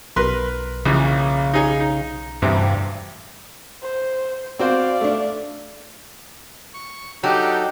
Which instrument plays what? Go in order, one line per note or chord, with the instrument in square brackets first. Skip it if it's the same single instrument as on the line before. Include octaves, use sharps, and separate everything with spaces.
[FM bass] B1 [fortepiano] A#4 B4 C6
[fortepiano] A#1 E3 [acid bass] C#3
[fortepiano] D#4 G#4 C#5
D#4
[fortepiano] D2 C3 E3 [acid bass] G2
[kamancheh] C5
[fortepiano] C4 F#4 C5 [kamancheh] D5 F5
[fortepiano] A3 D4
[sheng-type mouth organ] C#6
[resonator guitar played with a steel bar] F#3 [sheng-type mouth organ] D4 D#4 A4 [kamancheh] G4